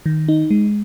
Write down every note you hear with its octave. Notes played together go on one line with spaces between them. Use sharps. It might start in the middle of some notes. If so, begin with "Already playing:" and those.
D#3
D#4
G#3